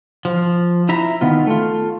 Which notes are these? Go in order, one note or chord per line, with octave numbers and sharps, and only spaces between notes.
F3
E4 E5 A#5
D#3 B3 F4
A3 F4